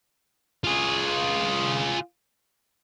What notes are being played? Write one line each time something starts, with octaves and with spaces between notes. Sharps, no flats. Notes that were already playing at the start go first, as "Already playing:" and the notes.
F4 G#4